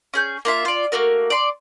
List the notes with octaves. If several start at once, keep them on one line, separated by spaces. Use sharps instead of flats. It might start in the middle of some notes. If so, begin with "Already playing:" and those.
C#4 G#4 G6
A#3 F4 E5
F4 D5
A3 A#3 F#4 A#4
D5 C6